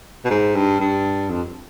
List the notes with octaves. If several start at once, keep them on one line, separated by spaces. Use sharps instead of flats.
B2
G#2
G2
G2
F2